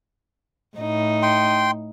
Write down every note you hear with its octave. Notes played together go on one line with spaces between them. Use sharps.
A2 D#4
G5 C6